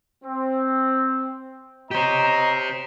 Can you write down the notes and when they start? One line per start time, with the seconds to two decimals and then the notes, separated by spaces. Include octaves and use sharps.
0.24 C4
1.91 G4 C5 C#5 D#5 A#5